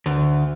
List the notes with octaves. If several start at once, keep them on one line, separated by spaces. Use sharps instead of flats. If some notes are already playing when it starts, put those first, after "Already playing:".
D2